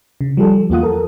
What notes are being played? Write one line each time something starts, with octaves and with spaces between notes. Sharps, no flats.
C#3
F3 G3 G4 A4
E2 A#3 F4 F#5 D#6
A4 A#4